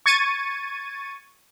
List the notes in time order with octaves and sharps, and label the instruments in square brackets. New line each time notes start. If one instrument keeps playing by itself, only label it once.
[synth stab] C#6 G#6 A6 C#7 D#7